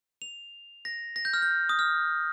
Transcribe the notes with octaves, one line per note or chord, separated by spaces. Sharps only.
F7
A#6
A#6
G6
F6
G6
D#6
F6